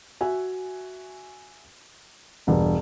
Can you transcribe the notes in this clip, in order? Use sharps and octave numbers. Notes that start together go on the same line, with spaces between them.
F#4 E5 G#5
E1 G2